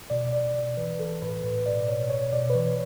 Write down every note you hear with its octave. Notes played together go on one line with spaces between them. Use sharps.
B2 D5
B2 D5
B2
E3 B4
E3 A4
A2 B4
A2 B4
B2 D5
B2 C#5
B2 C#5
B2 D5
B4
E3 C#5